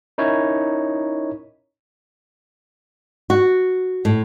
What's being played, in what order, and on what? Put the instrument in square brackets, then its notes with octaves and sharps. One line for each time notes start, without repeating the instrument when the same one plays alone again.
[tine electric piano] C#4 D#4 E4 A#4 C#5
[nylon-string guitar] F#4
A2